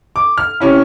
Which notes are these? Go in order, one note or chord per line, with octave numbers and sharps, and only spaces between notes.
D6
F6
C3 C#4 E4